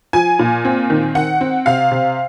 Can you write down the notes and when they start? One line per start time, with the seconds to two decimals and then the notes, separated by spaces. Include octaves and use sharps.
0.13 F3 G#5
0.39 A#2
0.65 C4
0.90 D#3
1.15 D#3 F#5
1.41 C4
1.66 C3 F5
1.91 C3